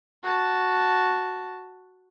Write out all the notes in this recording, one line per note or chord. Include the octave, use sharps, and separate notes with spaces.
F#4 A5